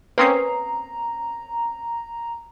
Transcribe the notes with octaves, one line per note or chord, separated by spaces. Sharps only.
A#3 C4 C#4 B4 A#5 D#6 C7